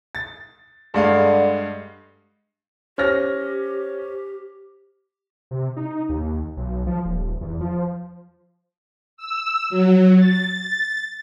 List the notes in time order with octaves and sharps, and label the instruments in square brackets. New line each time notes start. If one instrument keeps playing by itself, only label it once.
[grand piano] A6
[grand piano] G2 G#3 F5 [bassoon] D3
[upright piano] C#4 F6 A#6 [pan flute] G4 [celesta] C5
[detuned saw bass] C3
D#4
D#2
B1
F3
D#1
E2
F3
[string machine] E6
F#3
A6